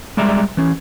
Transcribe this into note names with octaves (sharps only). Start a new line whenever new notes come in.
G3 G#3 D5 E5 A#5
E3 C#4